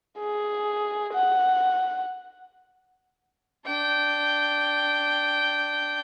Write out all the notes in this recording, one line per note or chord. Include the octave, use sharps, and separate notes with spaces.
G#4
F#5
D4 G5